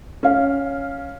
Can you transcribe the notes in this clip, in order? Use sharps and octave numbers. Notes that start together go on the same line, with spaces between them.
C#4 F5